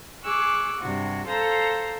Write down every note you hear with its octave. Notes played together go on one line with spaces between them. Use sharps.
G#4 C#6 D6 E6 F#6
G2 C3 F#4
A4 C5 F5 A#5 G6